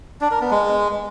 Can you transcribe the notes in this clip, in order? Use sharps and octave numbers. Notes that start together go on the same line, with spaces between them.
D4
A#4
B3
G#3